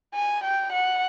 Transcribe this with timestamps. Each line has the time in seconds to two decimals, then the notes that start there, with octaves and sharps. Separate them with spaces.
0.15 G#5
0.44 G5
0.72 F#5